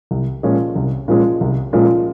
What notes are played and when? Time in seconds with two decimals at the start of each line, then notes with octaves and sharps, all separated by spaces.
0.11 C2
0.43 A#2 F3 G#3 C#4
0.76 C2
1.08 A#2 F3 G#3 C#4
1.41 C2
1.73 A#2 F3 G#3 C#4